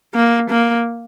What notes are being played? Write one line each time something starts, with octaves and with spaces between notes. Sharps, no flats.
A#3
A#3